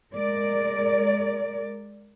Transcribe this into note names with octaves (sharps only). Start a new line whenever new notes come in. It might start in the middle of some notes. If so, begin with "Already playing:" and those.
G#3 A#4 D5